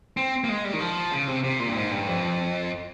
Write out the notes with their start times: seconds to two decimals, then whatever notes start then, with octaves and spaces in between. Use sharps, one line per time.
0.17 C4
0.44 A#3
0.49 G#3
0.64 G3
0.73 D#3
0.80 F3
1.12 C#3
1.27 C3
1.44 C3
1.60 A#2
1.68 G2
1.75 G#2
1.91 G2
2.07 F2